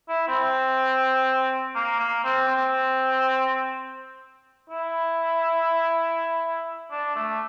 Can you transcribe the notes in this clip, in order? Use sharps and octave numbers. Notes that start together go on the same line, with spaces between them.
E4
C4
A#3
A#3
C4
C4
E4
D4
A3